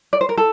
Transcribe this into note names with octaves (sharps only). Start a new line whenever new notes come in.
D5
C5
A#4
A4